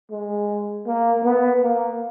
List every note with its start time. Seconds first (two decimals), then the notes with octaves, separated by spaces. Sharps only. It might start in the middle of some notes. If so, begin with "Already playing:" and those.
0.11 G#3
0.86 A#3
1.24 B3
1.62 A#3